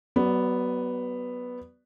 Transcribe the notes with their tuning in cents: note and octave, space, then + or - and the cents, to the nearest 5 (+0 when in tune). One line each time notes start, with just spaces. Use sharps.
F#3 +30 B3 +0 D5 +0